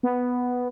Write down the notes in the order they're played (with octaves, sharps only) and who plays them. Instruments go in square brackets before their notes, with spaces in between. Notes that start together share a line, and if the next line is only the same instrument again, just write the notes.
[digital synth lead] B3